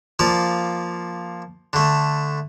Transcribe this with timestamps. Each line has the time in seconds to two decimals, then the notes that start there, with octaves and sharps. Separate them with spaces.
0.19 F3 A#3 D5
1.73 D3 A3